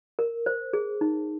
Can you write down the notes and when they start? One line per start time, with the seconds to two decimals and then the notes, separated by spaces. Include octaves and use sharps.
0.19 A#4
0.46 C5
0.73 G#4
1.01 D#4